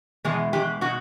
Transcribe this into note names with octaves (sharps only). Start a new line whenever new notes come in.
E2 B2 G#3 G#4
E2 B2 G#3 G4
B2 G#3 F#4